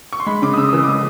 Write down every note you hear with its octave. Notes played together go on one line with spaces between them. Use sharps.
C#6
C6
G#3 B5
C#3 D6
D#6
C#3 E6
D#6
E3 E6
D6
G#3 D#6